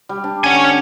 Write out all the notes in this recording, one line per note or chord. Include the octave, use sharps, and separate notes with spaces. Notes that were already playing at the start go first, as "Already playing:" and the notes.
G3
D4
D3 C#4 G#5